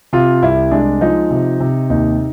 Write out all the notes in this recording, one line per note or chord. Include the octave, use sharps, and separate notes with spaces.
C3 F4
C2 E4
G#3 D4
F3 D#4
C3
C3
D#2 D#4